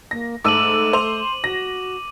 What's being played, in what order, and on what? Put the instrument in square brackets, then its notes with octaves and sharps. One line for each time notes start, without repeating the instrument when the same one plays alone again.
[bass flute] A#3 [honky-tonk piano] A#6
[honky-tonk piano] G#2 A4 E6 [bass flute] A3 [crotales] D6 D#7 F#7
[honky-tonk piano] C5 F7
[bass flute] F#4 [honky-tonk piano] A#6